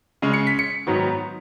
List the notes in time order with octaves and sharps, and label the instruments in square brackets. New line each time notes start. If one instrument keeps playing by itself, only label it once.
[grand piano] C#3 G#3 C#4
C#7
B6
C#7
G#2 D#3 F#3 B3